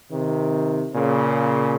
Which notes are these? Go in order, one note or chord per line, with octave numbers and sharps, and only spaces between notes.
C3 D#3
A#2 C#3